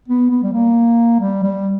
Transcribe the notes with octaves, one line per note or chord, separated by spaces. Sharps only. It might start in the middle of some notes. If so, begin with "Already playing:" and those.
B3
B3
G3
A#3
G3
G3